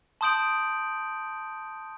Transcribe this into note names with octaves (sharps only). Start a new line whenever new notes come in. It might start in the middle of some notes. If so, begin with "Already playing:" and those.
A5 C6 D#6 G6 D7 F#7